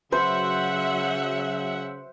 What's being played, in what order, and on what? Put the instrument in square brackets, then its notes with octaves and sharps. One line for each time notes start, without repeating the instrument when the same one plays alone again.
[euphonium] C#3 [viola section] F#3 E5 F#5 [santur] C5